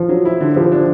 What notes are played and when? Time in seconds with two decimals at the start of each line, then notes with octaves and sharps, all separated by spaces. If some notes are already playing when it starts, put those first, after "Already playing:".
Already playing: F3
0.09 F#3
0.25 E4
0.41 D3
0.56 F3 G4
0.72 D4